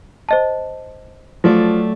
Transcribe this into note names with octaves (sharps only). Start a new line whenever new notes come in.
C5 D#5 A5
F3 F#3 A3 D5